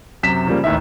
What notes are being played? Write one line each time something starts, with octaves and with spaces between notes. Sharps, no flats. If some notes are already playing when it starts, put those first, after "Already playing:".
F#2 C3 B6 E7
C#3 F3 G3 A#3
A1 D#2 D#4 E5